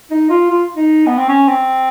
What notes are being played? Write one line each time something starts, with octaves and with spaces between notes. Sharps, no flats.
D#4
F4
F4
D#4
B3
C4
C#4
C4